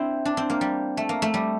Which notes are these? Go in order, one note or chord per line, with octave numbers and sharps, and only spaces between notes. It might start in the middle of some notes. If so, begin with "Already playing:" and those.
Already playing: C4 D4 E4
D4
C4
A#3
G3
A3
A#3
A3
G3